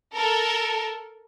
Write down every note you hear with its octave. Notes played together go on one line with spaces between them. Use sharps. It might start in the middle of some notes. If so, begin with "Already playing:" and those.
A4 A#4